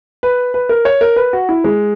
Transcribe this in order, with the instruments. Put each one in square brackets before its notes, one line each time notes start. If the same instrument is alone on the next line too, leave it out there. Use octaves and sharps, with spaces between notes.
[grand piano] B4
B4
A#4
C#5
A#4
B4
F#4
E4
G#3